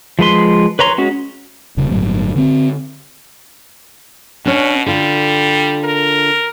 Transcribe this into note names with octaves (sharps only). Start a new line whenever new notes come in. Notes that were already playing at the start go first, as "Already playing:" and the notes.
F3 G#3 B4 C6
B4 C#5 A#5 C6
G#3 C#4 F#4
D#1 C#3
G1 C2 A2 F#3
D3 C4
B2 C#4 D4
D3 G3 F4
A#4